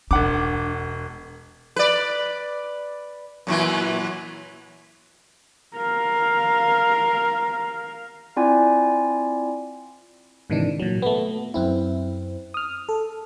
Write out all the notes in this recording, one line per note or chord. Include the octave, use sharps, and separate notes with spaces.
E1 D4 F#5 D6
B4 D5
F#2 A#2 E3
A#4 F5
C4 E4 F4 D5 G#5
G#2 C3 D#3 E3 D4
A#2 F#3
A3 B3
F#2 C4 E4
D#6 F6
A4